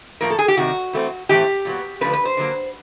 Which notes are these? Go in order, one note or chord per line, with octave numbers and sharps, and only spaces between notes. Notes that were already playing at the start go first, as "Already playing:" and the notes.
A2 F3 A#3 A#4
A4
G#4
G4
C3 D#3 G3 F#4
E3 A3 C4
A2 E3 A3 C4 G4
A#2 F#3 B3
D3 F3 A3 C4 B4
B4
C5
D3 F#3 A#3